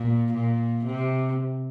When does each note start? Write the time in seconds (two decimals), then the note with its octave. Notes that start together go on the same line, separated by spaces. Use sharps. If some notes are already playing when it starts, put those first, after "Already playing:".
Already playing: A#2
0.33 A#2
0.85 C3